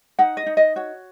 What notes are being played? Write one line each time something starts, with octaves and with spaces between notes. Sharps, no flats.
D#4 F#5
D#5
D#4
D#5
F#4 C#5